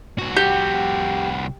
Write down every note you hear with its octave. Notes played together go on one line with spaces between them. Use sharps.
C2 F#4
G4